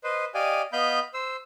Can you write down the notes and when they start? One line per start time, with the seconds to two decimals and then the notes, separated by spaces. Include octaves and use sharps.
0.04 B4 C5 D#5
0.34 G4 D5 D#5 F5 G#5
0.73 B3 D#5 F5 B5 G6
1.14 C5 E6